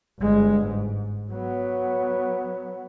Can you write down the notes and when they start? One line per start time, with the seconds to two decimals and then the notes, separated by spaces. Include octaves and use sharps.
0.19 G1 G#3
0.66 G#2
1.31 F#3 B3